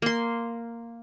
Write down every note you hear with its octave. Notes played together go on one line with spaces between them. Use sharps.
A#3 C6